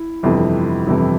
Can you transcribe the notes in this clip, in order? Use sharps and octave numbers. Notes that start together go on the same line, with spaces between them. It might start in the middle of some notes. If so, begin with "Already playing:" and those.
Already playing: E4
G1 F2 C3 E3
G1 F2 C3 E3 E4